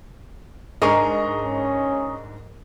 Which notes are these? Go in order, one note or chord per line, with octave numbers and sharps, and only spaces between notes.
G#2 D4 G#4 A#4 D#5 A#5 C#6
C#4